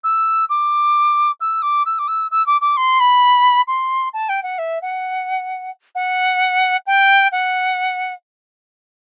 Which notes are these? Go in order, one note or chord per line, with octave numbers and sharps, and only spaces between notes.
E6
D6
E6
D6
E6
D6
E6
E6
D6
D6
C6
B5
C6
A5
G5
F#5
E5
F#5
F#5
G5
F#5